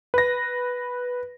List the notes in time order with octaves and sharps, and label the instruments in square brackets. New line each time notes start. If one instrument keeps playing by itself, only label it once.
[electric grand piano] B4 A#6